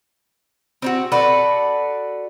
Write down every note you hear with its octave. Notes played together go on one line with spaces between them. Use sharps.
C4 D#4 F#4
F#4 A4 B4 D5